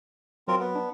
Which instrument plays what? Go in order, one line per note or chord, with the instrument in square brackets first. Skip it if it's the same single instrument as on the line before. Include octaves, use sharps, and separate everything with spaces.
[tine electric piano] F#3 [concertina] C4 F4 A#4
[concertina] B3
[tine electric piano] D4